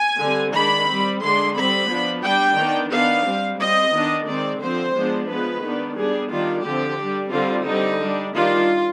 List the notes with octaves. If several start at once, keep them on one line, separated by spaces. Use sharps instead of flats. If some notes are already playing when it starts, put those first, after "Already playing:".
Already playing: G#5
D3 G3 C4
D#3 G#3 D4 B5
G3 C4
D3 G#3 D4 C6
G3 C4 B5
F3 B3 D4
G3 D4 G5
D#3 B3 D4
D#3 B3 D4 F5
G3 C4
G3 C4 D#5
D#3 B3 D4
D#3 G#3 C4 D5
D3 F3 C4 C5
F3 G#3 B3 D4
F3 G#3 B3 B4
D#3 B3 D4
G3 B3 D4 G#4
D#3 G3 D4 F4
D3 F3 C4 G4
G3 D4
D3 G3 C4 F4
D3 G3 C4 D#4
G3 D4
D#3 G3 D4 F4